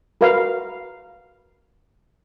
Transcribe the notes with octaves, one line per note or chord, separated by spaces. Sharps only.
F#4 A#4 B4 F5